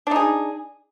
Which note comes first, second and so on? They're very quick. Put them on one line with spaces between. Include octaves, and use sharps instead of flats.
D4 D#4 G#4